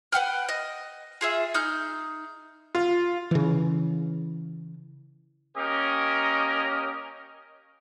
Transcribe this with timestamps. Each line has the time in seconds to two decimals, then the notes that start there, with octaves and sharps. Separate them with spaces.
0.12 B4 F#5 G5 F6
0.49 D#5
1.21 F4 G#4 E5
1.54 D#4 F6 G6
2.75 F4
3.31 C#3 E3
5.57 A#3 C#4 G4 A#4 D#5